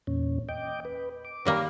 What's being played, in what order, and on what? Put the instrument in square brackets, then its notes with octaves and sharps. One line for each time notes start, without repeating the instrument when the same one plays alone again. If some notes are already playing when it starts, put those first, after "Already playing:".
[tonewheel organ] E2 A#2 C#4
D#5 G5 D6
B4
D6
[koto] D#3 G3 A#3